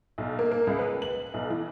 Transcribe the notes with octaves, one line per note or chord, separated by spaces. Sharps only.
B1
A#3
A#3
C#2
B4
F#7
B1
E3